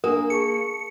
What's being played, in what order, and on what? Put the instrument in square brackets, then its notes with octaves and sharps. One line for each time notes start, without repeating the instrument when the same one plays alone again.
[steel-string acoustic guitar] A#3 [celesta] D4 G#5 D#6 [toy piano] A#4
[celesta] G#4 A5 C#6 [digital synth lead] C#7